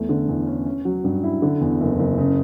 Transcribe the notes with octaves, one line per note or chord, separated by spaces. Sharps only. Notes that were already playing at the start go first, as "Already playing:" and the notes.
Already playing: E2 A3
D3
E2
C#4
C#4
F#3
G2
E4
D3
E2
F#1
F#1
C#3